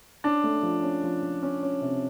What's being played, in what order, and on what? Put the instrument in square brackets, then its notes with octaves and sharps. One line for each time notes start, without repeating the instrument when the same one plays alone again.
[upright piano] C#4 [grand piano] D4
[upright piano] A3
F3
C#4
F3
F3
C#4
C#4
C3